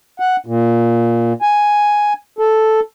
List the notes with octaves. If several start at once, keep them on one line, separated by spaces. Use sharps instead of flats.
F#5
A#2
G#5
A4